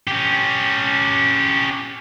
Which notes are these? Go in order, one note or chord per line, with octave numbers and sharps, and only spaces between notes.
C#4 G4